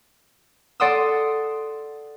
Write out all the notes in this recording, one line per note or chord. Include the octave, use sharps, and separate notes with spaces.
A4 D5 F#5 C6 D#6 E6